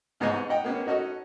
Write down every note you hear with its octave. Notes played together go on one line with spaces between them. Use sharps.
C2 G#2 B3 D#4 D#5 G#5
D#4 D#5 F#5 G5
A#3 B3 C#4
C#4 D#4 F#4 A4 D#5